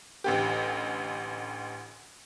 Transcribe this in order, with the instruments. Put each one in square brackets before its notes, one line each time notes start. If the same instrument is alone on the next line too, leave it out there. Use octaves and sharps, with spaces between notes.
[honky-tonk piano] A1 D2 G4